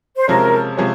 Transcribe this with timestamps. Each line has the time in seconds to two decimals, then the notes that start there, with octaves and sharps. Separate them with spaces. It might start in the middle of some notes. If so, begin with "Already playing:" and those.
0.17 C5
0.28 C3 F3 G#3 C#4 A#4
0.77 C3 F3 G#3 C#4